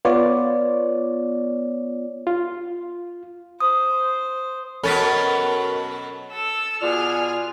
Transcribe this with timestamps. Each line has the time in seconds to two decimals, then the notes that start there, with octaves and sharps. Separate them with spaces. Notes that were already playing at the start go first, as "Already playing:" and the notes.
0.05 B3 F4 C#5 D5
2.27 F4
3.60 C5 D#6
4.83 B2 F#3 C#4 A4 A#4 B5 A6 B6
6.32 A4 E6
6.82 B2 F4 G#4 D5 G#5 F6